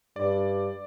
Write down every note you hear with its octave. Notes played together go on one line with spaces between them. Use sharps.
G2 D5